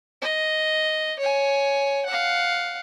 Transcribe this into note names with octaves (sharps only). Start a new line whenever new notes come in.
D#5
C#5 G#5
F5 F#5